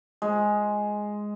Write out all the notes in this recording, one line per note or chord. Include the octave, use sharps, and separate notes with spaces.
G#3